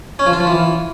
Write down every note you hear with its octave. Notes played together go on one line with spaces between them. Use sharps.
C#4
F3
F4
F3
E3